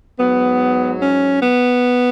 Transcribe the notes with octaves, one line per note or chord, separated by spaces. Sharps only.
G#2 F#3 B3
C#4
B3